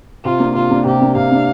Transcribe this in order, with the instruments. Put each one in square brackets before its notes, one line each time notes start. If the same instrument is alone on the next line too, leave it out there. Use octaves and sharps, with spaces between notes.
[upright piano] C3 [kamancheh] F4
[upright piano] A#3 D4
[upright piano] C3 [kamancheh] F4
[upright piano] A#3 D4
[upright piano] C3 [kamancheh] G4
[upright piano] A#3 D4
[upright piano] C3 [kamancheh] F5
[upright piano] A#3 D4